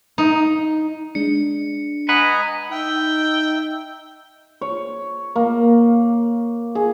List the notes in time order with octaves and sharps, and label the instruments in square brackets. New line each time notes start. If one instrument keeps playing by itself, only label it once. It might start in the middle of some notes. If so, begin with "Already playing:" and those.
[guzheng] D#4
[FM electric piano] G#3 D4 [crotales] C#7
[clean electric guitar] B4 F#5 [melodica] D#5 G#5 A#5 [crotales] F#6 B6
[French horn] D#4 [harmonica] E5 G5
[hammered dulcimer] C#5
A#3
G#4